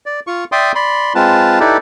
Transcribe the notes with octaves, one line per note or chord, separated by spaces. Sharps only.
D5
F4 C#6
D5 E5 G5 C6 D6 D#6
D5 B5 C6
G#3 C4 F4 B4 A5
D#4 E4 G4 A4 B4 D5